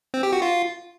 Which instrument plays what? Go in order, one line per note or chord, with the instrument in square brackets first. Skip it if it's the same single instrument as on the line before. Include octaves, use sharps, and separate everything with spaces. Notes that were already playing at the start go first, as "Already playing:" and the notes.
[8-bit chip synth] C4
G4
F#4
F4